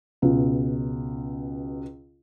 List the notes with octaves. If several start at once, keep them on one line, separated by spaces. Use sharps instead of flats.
C#2 B2